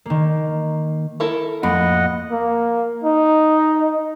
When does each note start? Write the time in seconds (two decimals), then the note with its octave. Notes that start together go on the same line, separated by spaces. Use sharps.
0.06 D#3 A#3
1.20 E4 A4 A#4
1.63 F2 A2 A#3 D#5 F#5 B5
2.31 A#3
3.04 D#4